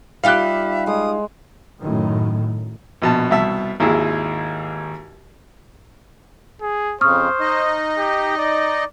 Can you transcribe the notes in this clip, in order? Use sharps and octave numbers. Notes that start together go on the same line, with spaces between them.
G3 D#4 F4 G4 E5 F5 F#6
G#3 D#6
F#2 A2 D#3
A#1 B2 A5
C2 B2 E5 A5
G#1 D#2 G#3 E4 G#4
G#4
F2 C#3 C5 C#6 D#6 F6
D#4 D#5
G4
D5